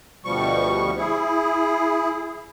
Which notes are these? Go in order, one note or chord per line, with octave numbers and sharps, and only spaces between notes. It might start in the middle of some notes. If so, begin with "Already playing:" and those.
D2 B2 F3 G3 C#6
E4 G#4